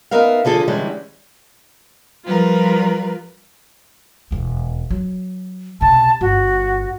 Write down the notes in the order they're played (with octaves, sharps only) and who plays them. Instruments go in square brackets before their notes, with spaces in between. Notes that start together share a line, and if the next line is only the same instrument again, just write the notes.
[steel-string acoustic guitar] B3 D#4 A#4 E5 F5
D3 F3 G#4 A4
D3 E3 G3 G#3 C#4
[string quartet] F3 G3 F4 A#4 B4
[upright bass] E1 D#2
F#3
[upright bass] B1 C3 [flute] A5
[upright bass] G1 [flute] F#4